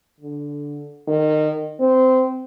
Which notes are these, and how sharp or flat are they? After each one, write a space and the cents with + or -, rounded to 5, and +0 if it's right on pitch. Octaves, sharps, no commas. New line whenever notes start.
D3 -10
D#3 -25
C4 -20